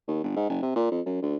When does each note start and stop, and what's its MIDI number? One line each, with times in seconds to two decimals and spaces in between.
0.08 0.20 39
0.24 0.33 31
0.36 0.46 44
0.49 0.59 30
0.62 0.75 48
0.76 0.89 46
0.92 1.01 41
1.06 1.20 42
1.22 1.36 38